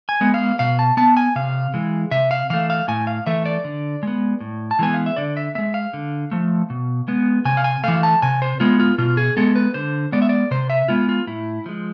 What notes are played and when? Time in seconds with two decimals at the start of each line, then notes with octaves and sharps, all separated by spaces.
0.09 G#5
0.21 G#3 B3
0.34 F5
0.59 B2 F5
0.79 A5
0.97 B3 A5
1.17 G#5
1.36 C3 F5
1.74 E3 G#3
2.11 C3 E5
2.31 F5
2.50 E3 A3 F5
2.70 F5
2.88 A2 G#5
3.07 F5
3.27 E3 A3 E5
3.46 D5
3.64 D3
4.03 G#3 B3
4.41 A2
4.71 A5
4.79 E3 G#3 B3 G#5
4.94 F5
5.06 E5
5.16 D3 D5
5.37 E5
5.55 G#3 B3 E5
5.74 F5
5.93 D3
6.31 F3 A3
6.70 B2
7.08 G#3 B3
7.45 C3 G#5
7.57 F5
7.64 G#5
7.84 E3 A3 F5
8.03 A5
8.22 C3 G#5
8.42 C5
8.60 G#3 B3 F4
8.80 F4
8.98 B2 F4
9.17 G#4
9.37 G#3 B3 A4
9.56 B4
9.74 D3 C5
10.12 G#3 B3 D5
10.22 E5
10.29 D5
10.51 C3 C5
10.70 E5
10.88 G#3 B3 F4
11.09 F4
11.27 A2 E4
11.66 F3 G#3